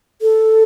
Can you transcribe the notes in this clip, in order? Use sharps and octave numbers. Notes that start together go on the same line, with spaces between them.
A4